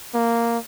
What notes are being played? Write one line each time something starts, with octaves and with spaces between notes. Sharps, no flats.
A#3